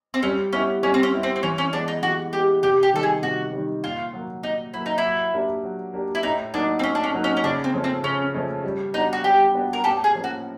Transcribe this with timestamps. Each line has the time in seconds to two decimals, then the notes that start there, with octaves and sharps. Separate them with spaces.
0.14 C4
0.23 G3 C#4
0.53 B3 C#4 E4 G4
0.83 G3 C#4
0.94 C4
1.03 C#4
1.13 B3 E4 G4
1.23 C4
1.36 C4
1.43 E3 C#4
1.58 C#4
1.73 G#3 B3 D4
1.88 D#4
2.03 E3 F#4
2.33 G#3 B3 G4
2.63 C3 G4
2.83 G4
2.93 D#3 G3 A4
3.03 G#4
3.23 C3 F#4
3.53 D#3 G3
3.84 A#2 F4
4.13 F#3 A#3
4.43 A#2 D#4
4.73 F#3 A#3 E4
4.86 D#4
4.98 E4
5.03 F#3
5.34 A#3 D4 G4
5.64 F#3
5.94 A#3 D4 G4
6.15 E4
6.23 A2 D#4
6.54 F#3 A#3 D4 D#4
6.79 C4
6.83 A2 C#4
6.95 D4
7.04 C#4
7.14 F#3 A#3 D#4
7.24 C#4
7.37 C#4
7.43 C#3 D4
7.64 C4
7.74 F3 A3 C#4
7.84 C4
8.04 C#3 C#4
8.34 F3 A3 C#4
8.64 G3
8.93 B3 D4 D#4 F#4
9.13 F#4
9.24 G3 G4
9.54 B3 D4 F#4
9.73 A#4
9.84 A2 G4 A4
10.04 G#4
10.15 F3 A#3 C#4
10.24 F#4